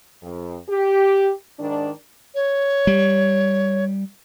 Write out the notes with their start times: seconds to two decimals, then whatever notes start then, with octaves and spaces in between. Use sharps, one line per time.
0.23 F2
0.70 G4
1.60 G#2 D#3 D4
2.35 C#5
2.87 G3